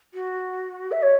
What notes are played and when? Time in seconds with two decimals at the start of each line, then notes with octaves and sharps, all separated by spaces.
0.14 F#4
0.91 E5
1.02 C#5